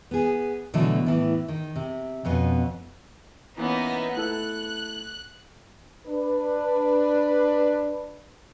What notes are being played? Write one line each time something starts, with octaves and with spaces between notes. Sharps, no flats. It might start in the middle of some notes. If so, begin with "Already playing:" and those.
B3 G#4
B2 D3 E3 F#3 A3
A2 E3
D#3
C3
F2 B2 B3 C#4
E3 A#3 B3 C#4 D#4 E5
A3 E4 A4 F#6
D4 B4